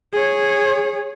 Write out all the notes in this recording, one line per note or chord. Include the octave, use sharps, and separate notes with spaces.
G#4 C#5